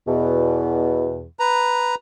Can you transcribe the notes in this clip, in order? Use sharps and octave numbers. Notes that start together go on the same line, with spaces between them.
E2 B2
B4 A#5